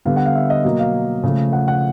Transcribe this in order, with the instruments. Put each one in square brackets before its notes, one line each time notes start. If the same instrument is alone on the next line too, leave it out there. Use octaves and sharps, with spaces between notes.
[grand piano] D3 G3 B3 F5
F#5
F5
E5
D#5
B2 F#3 A#3 D#5
F5
C#3 F3 A3
F#5
F#5